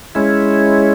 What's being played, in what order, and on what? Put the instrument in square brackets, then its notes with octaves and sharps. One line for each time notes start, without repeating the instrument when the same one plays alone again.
[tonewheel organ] G#3 C#4 E4